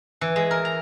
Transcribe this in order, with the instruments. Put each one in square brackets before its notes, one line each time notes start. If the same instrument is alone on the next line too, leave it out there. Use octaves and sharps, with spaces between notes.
[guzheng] E3
G#3
A#4
A#5